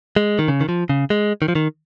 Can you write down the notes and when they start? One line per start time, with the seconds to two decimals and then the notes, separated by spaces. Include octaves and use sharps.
0.16 G#3
0.39 D#3
0.48 C#3
0.61 D#3
0.69 F3
0.89 C#3
1.10 G#3
1.42 D#3
1.48 F3
1.55 D#3